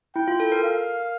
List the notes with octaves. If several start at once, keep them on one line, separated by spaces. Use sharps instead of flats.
E4 G5
F4
A4
A#4
F5